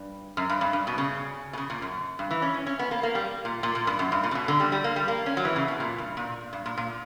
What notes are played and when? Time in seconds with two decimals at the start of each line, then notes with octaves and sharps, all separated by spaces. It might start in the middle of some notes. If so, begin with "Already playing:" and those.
Already playing: G2
0.37 F#2
0.49 G2
0.61 G2
0.73 G2
0.87 B2
0.98 C#3
1.53 B2
1.58 C#3
1.70 A#2
1.82 F#2
2.19 G2
2.31 E3
2.42 C#4
2.54 C#4
2.66 C#4
2.79 B3
2.91 A#3
3.03 A#3
3.15 G3
3.45 A#2
3.63 A#2
3.75 A#2
3.87 G2
3.99 F#2
4.12 G2
4.23 A#2
4.31 C#3
4.35 B2
4.48 D3
4.60 G3
4.72 G3
4.84 A#3
4.96 G3
5.08 A#3
5.26 C#4
5.37 F#3
5.45 E3
5.56 C#3
5.68 B2
5.80 A#2
5.98 G2
6.17 A#2
6.53 G2
6.66 A#2
6.78 A#2